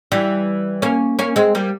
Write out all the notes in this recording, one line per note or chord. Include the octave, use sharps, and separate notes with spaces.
E3 G3
A#3 C#4
A#3 C#4
G#3 C4
G3 A#3